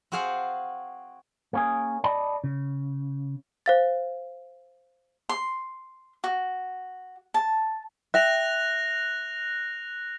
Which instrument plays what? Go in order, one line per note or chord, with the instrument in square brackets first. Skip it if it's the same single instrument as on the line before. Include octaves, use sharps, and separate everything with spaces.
[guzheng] C4 F#4 G#4 C5 F5 F#5
[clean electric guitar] A#3 C#4 G#4
D5 D#5 A5 B5
C#3
[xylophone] C5 F5 A6
[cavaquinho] C6
F#4
A5
[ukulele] E5 G5 [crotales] F#6 A#6 F7